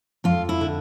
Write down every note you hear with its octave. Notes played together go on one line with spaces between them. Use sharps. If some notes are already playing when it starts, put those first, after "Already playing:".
F2 F4
E4
D3